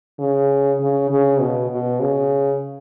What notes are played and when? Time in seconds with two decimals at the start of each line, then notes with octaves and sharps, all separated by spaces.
0.19 C#3
0.80 C#3
1.10 C#3
1.40 B2
1.71 B2
2.00 C#3